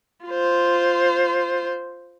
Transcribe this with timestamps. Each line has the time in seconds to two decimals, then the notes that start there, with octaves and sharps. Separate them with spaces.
0.25 F4 C5